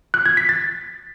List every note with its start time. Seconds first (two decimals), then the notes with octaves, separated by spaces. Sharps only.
0.14 F#6
0.26 G#6
0.37 B6
0.49 A6